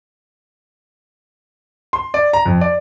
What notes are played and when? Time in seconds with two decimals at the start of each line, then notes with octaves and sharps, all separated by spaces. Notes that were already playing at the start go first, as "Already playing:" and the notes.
1.93 C6
2.14 D5
2.33 A#5
2.45 F2
2.61 D5